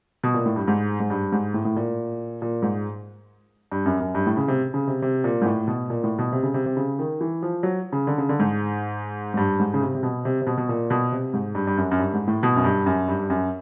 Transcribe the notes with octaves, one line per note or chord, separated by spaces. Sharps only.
B2
A#2
A2
G2
G#2
G#2
G2
G#2
A2
A2
A#2
A#2
G#2
G2
F#2
F#2
G2
A2
C#3
C3
C#3
C3
C3
A#2
G#2
A2
B2
A#2
A2
B2
C3
C#3
C3
C3
C#3
D#3
E3
F3
F#3
C#3
D3
C#3
D3
G#2
G#2
G2
G#2
C#3
C3
C3
B2
C3
C3
B2
B2
A#2
B2
C3
G#2
G2
G2
F#2
F#2
G2
G#2
A2
B2
F#2
G2
F#2
G2
G2
F#2